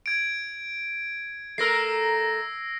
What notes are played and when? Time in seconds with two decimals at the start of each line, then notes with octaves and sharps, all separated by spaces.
0.06 G#6 D7
1.58 A3 A#4 E6 A#6 C7